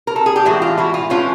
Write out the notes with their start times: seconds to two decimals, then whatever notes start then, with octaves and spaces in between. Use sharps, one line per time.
0.07 A#4
0.16 A4
0.26 G#4
0.36 G4
0.45 A2 E3 G#3 E4 F#4
0.62 F4
0.78 E4 F#4
0.94 F4
1.10 A2 E3 G#3 C#4 F4